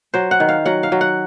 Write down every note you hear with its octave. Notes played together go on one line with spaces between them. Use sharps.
F#3 C5
F#5
D#3
F5
F#3 F#5
F5
F#3
F#5